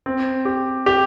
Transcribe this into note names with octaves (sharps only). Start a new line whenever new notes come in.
C4
G4
G4